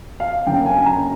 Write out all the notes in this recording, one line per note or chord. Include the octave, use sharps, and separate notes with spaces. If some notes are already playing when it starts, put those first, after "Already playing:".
F5
F#1 F#2 D3 F#3 A#3 G5
G#5
A#5